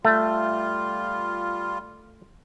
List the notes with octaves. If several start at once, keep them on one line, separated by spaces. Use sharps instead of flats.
G3 A3 F4